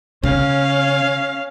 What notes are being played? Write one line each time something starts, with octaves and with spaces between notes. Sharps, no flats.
C#3 C#4 F5